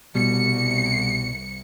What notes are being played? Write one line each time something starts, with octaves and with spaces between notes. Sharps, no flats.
C2 B2 G3 C#7